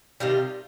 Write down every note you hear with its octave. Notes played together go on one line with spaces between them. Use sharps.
C3 D#3 G3 F4